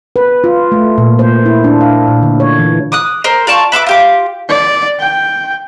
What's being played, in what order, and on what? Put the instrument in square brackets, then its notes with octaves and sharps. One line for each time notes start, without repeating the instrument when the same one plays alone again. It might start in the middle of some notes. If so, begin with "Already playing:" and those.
[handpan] B4
F4
A3
A#2
C5
E4
D4
F5
A#2
D3
C#5
E3
[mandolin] D6 D#6 F#6
A#4 C5
F4 D5 A5 C#6
B4 E5 C6 D6
F4 G4 D6
[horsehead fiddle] D5
G5